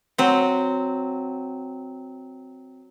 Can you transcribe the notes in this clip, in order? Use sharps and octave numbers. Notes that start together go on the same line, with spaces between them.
F#3 C4